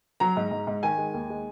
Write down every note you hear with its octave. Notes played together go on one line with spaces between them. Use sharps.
F#3 A#5
G#2
G#2
G#2
D#3 G#5
G#3
D#2
G#3